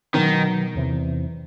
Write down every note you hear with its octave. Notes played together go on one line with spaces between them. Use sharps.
B2 D#3 F#3 B3
E2 C3 E3